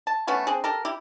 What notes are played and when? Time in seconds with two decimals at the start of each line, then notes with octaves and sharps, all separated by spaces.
0.07 A5
0.27 A3 B3 C#4 F#4
0.47 C4 D4 G#4
0.64 G4 A4 A#4
0.85 E4 G4